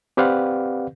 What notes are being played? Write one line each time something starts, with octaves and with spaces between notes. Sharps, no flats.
C4 G4 B4 D5 F5 F#5